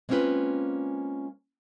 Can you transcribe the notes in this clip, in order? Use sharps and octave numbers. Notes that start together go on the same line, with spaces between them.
G#3 A#3 C4 C#4 F4 B4